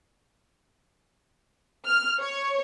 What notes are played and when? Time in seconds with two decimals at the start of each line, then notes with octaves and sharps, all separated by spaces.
1.85 F6
2.20 C#5